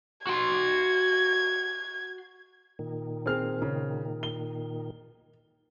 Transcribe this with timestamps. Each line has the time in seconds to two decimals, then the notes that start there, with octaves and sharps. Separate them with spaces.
0.27 F#4 C6 G#6
2.79 A#2 D#3
3.26 C4 G#4 F6
3.62 C#3
4.23 G7